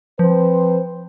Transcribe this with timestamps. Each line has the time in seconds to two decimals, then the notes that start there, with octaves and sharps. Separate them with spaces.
0.19 F3 C4 B4 C5